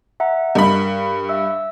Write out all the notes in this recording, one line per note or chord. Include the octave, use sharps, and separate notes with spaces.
E5 F#5 A#5
G2 A#4 B5
E5 E6